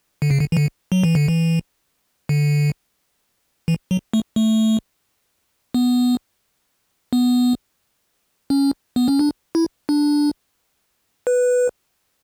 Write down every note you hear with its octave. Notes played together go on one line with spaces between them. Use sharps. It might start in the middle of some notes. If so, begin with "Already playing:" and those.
D3
C#3
D3
E3
D3
F#3
E3
D3
E3
D3
E3
F#3
A3
A3
B3
B3
C#4
B3
C#4
D4
E4
D4
B4